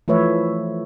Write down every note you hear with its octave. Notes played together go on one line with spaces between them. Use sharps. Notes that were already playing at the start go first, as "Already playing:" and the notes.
E3 F3 A3 B4 C#5 E5